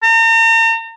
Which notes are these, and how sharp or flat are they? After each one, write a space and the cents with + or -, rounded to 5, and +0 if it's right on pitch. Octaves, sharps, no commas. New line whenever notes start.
A#5 -40